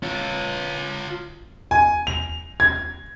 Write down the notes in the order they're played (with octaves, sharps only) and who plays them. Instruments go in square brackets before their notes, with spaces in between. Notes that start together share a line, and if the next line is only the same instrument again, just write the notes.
[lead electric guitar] F4 C#5
[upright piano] G#5
F7
G#6